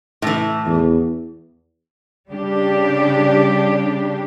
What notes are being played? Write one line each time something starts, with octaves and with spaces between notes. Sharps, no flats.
A2 E3
E2
C#3 G3 D4 G4